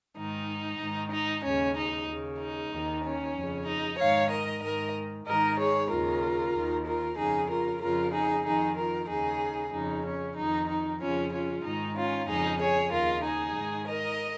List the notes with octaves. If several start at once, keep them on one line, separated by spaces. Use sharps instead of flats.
G#2 D#3 D#4
G#2 D#3
D#4
D#2 C#3 C#4
D#4
D#2 C#3
D#4
D#2 D#3
C#4
F2
C#3
D#4
G#2 D#3 C#5 F5
A#4 D#5
G#2 D#3 A#4 D#5
G#2 D#3 A#4 D#5
G#4 C#5
D#2 C#3 F4 A#4
D#2 D#3
F4 A#4
F2 C#3 D#4 G#4
F4 A#4
F2 C#3 F4 A#4
D#4 G#4
F2 D#3 D#4 G#4
F4 A#4
D#2 C#3 D#4 G#4
F2 C#3 D#4
C#4
F2 D#3 D#4
D#4
F2 C#3 C#4 F4
C#4 F4
G#2 D#3 D#4
C#4 F4
F2 C#3 D#4 G#4
G#4 C#5
D#2 C#3 F4 A#4
D#4 G#4
G#2 D#3
A#4 D#5